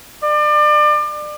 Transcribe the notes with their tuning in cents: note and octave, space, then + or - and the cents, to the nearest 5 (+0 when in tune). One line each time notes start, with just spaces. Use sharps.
D5 +30